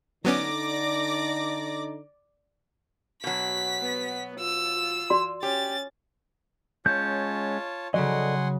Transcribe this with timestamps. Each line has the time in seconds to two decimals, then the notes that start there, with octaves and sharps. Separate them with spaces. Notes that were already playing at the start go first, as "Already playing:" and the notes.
0.25 D3 F#3 B3 C#4 D#4 D5 D6 A#6
3.24 B2 F#3 B6
3.82 B3
4.40 F4 E6
5.10 F#4 D5 C6
5.43 C#4 G4 A6
6.86 G#3 C#4 F4 C#5 A5 G6
7.94 C#3 F#3 A4 D5 D#5 F#5 G#5 C6